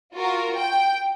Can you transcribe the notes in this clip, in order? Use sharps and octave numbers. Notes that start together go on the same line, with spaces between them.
F4 F#4 A#4
G5